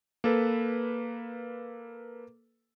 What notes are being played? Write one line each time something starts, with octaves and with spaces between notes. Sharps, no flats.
A#3 A4 B4